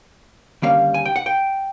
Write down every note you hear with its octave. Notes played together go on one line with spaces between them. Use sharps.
D#2 D3 G3 A#3 C#4 F5
G#5
G5
F#5
G5